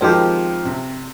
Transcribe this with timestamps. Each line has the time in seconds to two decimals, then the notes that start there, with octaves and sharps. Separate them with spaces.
0.01 D#3 F3 G#3 C4 G4
0.65 C3